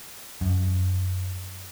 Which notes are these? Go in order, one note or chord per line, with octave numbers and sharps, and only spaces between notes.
F#2